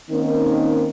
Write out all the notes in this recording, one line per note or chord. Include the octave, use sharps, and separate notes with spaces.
D#3 A#3 C4 C#4 D#4